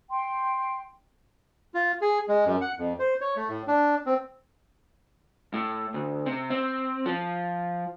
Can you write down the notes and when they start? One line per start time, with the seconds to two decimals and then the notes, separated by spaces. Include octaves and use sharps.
0.10 G5 C6
1.74 F4
2.01 G#4
2.29 G#3
2.46 F#2
2.61 F#5
2.78 F2
2.99 C5
3.21 C#5
3.36 A3
3.49 A2
3.68 D4
4.06 C4
5.54 A2
5.94 D2
6.26 C3
6.50 C4
7.06 F3